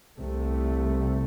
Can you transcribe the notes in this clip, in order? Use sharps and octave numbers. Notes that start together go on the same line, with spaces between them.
C2 C3 A3